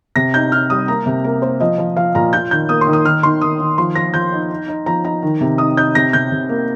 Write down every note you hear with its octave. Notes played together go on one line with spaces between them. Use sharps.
C3 A#6
D#4 G6
D#4 F6
G3 D#6
A#3 A#5
C3
A#3 A#4
A#3 C5
F3 D#5
F3
F3 F5
A#2 A#5
F4 G6
D#3 G6
A#3 D#6
C6
D#3
D#6
D#3 F6
D#3 C6
D#3 D#6
D#3
F3 C6
F3 A#6
F3 G6
D#4
D#4
D#4
F3 A#5
D#4 A#5
D#3
C3
D#4 D#6
D#4 G6
C3 A#6
C3 G6
C3
A#3